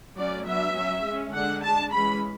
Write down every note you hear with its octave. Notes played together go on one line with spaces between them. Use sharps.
F#3 A3 C#4 D5
F#3 B3 D4 E5
F#3 C#4
G#3
C#4
D3 G#3 D4 F#5
G#3 D4 A5
E3 G#3 C#4 B5